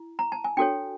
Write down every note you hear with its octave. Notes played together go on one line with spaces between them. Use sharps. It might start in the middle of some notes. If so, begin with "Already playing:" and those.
Already playing: E4
A#5
A5
G#5
D4 F#4 A4 C#5 G5